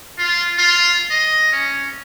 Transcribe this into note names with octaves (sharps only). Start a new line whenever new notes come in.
F4
F4
D#5
C#4